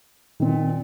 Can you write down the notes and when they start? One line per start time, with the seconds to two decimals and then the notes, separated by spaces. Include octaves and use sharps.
0.40 A#2 D#3 C4